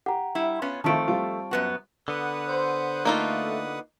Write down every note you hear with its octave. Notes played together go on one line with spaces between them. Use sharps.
G4 F#5 A#5
G3 E4
B3 C#4 F4
D#3 F3 A3 C4 F4 A5 C#6 D7
G3 C4 F4
F#2 B3 F#4
D3 B3 B4 F#5 D#6
C5
A3 A#3 D#4 F4